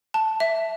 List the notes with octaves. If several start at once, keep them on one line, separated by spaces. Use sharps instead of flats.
A5
E5